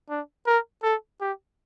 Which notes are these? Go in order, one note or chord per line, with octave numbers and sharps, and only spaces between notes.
D4
A#4
A4
G4